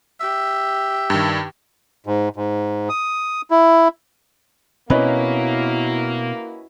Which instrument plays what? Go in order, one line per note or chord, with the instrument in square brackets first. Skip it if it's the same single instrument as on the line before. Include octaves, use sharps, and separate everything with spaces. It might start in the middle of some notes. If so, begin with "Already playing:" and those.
[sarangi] G4 [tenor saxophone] E5
[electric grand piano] G2 D#3
[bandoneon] G#2
G#2
D#6
E4
[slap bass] B2 C4 [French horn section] A#3 [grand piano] C#4 B4 D#5 [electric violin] E4 F#4